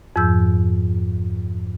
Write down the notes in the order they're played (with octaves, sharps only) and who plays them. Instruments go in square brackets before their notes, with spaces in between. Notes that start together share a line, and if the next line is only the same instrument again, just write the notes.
[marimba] F2 G#2 F3 E6 G6